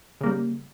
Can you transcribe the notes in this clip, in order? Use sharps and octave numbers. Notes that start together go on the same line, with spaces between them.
C#3 G3 A#3